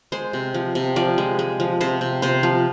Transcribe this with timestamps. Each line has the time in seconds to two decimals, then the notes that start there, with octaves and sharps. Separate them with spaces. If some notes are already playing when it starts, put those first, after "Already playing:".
0.12 G#3 C5
0.33 C3
0.54 F3
0.75 C3
0.96 F3 D5
1.18 G#3
1.39 G#3
1.60 F3
1.81 C3 C5
2.01 C3
2.22 C3 C5
2.43 F3